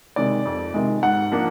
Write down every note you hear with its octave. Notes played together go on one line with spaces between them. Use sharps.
C3 D#3 G#3 D5
F2
C3 D#3 G#3
G#2 F#5
F3 A#3 D4